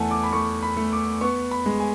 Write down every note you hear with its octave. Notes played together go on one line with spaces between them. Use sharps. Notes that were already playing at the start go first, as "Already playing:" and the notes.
Already playing: E2 A3 F#5 G#5 A5
D6
B5
A3 C#6
B5
A3
D6
B3 C#6
B5
G#3
G#5